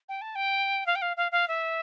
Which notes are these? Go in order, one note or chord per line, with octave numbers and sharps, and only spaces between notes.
G5
A5
G5
F5
G5
F5
F5
F5
E5